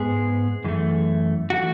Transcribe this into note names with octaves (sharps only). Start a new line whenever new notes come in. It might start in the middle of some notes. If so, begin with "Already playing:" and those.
Already playing: G#2 G#3 B3 G#4
F#2 E3 A3
E3 A3 F#4